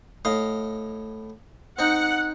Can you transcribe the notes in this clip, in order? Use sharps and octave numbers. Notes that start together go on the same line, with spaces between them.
A2 D#5 F5
C4 D#4 F#5